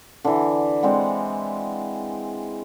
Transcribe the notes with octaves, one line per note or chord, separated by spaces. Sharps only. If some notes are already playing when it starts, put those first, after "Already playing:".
D3 E3
G#3 C4 D5 F#5